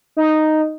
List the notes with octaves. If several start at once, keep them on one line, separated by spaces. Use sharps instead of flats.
D#4